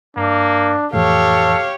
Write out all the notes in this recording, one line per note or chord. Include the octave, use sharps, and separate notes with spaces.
G2 A#3 D4
F2 A2 E3 G4 A4 C#5 F5